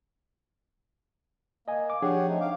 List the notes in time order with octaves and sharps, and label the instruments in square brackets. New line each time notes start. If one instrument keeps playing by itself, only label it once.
[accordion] A#3 [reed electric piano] D#5 G#5
[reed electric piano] D6
[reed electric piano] F3 D4 G#4 [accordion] G4 C#5 F#5
[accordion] A3 C4 D#4
F5 D6